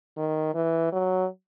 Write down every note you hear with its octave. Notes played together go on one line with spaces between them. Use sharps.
D#3
E3
F#3